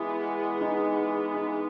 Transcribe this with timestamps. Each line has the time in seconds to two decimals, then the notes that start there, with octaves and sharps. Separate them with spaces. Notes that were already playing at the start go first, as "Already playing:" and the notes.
Already playing: E3 G#3 B3 E4
0.61 D#4
1.34 D#4